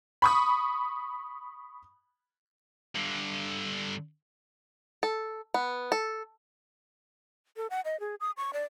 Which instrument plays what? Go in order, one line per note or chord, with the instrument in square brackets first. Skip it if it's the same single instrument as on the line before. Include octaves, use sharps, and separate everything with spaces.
[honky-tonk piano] B5 C#6 D#6
[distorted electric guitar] G2 D3
[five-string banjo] A4
B3
A4
[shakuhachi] A4
F#5
D#5
G#4
D#6
C#6
D5